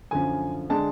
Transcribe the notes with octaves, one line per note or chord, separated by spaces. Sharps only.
F#2 D3 F3 G#5
D3 G#3 D4 A5